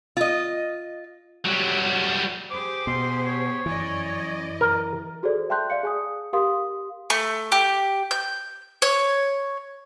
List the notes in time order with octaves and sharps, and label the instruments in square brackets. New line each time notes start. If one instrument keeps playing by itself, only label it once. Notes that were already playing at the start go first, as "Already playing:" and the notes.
[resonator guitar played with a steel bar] F4 D#5
[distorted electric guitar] F#3 G3
[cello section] G4 G#4 C5 [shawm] D6
[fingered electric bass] B2 [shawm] C6
[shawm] C#5
[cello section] F#2 D5 D#5 [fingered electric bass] E3
[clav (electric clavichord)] A#4
[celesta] F#4 G#4 A4 C5 D5
E5 G5 A5 C6 F#6 G6
D5 F5 C#7
G#4 G#5 D#6
G4 A#4 F5 C6 D#6
[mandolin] A3
G4
G6
C#5